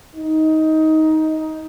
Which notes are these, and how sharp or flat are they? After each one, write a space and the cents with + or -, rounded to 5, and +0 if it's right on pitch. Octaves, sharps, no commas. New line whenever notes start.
D#4 +15